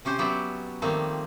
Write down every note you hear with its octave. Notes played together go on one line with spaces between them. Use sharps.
C3 C#4 G4 C5
F#3 B3 C#4 G4 D5 E5
D#3 F3 G3 A3 A#3 C4